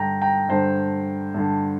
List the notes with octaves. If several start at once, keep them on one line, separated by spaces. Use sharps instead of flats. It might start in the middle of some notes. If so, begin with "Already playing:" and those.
Already playing: G2 D3 G5 A#5
G5 A#5
G2 D3 C5
G2 D3